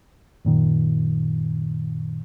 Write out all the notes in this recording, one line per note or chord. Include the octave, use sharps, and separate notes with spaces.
F#2 A#2 D#3